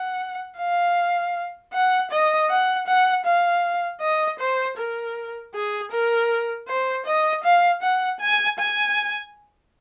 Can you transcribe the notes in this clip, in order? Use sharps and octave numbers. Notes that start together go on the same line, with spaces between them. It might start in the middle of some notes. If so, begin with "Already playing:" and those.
Already playing: F#5
F5
F#5
D#5
F#5
F#5
F5
D#5
C5
A#4
G#4
A#4
C5
D#5
F5
F#5
G#5
G#5